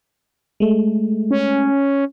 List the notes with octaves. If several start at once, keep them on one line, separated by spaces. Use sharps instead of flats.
G#3 A3
C#4